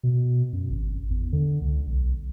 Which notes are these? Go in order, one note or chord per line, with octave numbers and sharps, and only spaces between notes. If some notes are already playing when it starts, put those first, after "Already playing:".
B2
F#2
G#1
E2
D3
C#2
B1